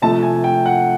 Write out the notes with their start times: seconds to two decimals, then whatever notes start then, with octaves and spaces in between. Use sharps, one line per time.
0.02 C3 F3 A3 A5
0.23 G#5
0.44 G5
0.66 F#5